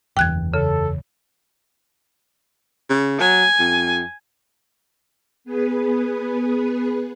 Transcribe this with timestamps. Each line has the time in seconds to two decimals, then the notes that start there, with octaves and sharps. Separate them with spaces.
0.17 F#1 E2 G5 F#6 G#6
0.54 C#3 A4
2.90 C#3
3.20 F#3 G#5
3.59 F2
5.44 B3 G#4 B4